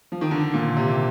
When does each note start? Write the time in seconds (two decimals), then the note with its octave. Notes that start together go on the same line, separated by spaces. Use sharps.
0.12 F3
0.21 D#3
0.31 D3
0.54 A#2
0.77 C3